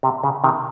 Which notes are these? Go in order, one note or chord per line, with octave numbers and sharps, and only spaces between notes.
C3
C#3
C3 D#3